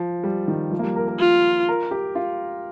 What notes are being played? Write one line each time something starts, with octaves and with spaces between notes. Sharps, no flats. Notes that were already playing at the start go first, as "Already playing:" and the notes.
Already playing: F3
G3
D#3
F3
A#3
G3
A#4
A#4
F4
A#4
G4
F4